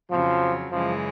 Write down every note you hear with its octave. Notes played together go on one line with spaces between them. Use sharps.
F2 C#3 F3 F#3
F#2 C#3 E3 F3 G#3